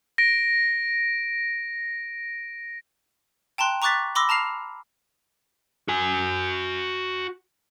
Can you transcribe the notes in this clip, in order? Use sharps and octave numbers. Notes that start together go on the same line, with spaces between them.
A#6 D7
G5 A5 A#5 C6 F#6
A#5 C#6 D6 F#6 A6 B6
B5 C6 D6 E6 A#6
A5 A#5 F6 C7 F7
F#4 G#5